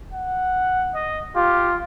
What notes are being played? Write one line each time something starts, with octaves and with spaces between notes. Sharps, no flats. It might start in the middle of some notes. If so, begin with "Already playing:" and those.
F#5
D#5
F4 G4